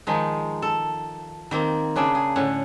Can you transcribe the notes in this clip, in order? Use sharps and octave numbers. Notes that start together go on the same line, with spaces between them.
D#3 F3 G#3 D#4
A4
D#3 A#3 C4
C#3 D4 G#4 D5 E5
G#4
A2 D3 C#4 F#5